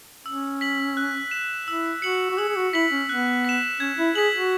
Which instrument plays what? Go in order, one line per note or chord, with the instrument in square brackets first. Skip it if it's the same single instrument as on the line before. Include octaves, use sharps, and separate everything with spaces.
[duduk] C#4 [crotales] E6
[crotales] B6 F#7
F#6
E7
[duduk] E4 [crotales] E6
[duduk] F#4 [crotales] C#7 F#7
[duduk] F#4
[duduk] G#4 [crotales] E6
[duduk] G#4
F#4
[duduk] E4 [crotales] B6 F#7
[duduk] C#4
[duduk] B3 [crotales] F#6
[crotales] B6 E7
[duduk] C#4 [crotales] G#6
[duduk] E4
[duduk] G#4 [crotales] B6 F#7
[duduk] F#4